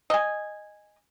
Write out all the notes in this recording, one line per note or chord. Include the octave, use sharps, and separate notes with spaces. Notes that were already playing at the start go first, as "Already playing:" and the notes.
D#5 G#5